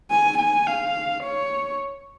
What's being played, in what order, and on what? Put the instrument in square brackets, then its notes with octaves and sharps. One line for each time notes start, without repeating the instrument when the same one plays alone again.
[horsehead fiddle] G#5
G#5
F5
C#5